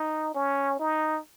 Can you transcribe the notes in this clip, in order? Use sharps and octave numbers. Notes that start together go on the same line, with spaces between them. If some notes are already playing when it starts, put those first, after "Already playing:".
Already playing: D#4
C#4
D#4